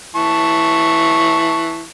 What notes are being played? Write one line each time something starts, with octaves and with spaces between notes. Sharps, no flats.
E3 A5 C#6